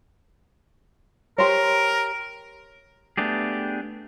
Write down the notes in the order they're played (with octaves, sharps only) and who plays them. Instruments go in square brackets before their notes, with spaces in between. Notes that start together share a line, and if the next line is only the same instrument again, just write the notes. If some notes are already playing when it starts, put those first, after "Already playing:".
[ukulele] G4 C5 C#5 [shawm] A#4
[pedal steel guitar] A3 B3 D4 G4 G#4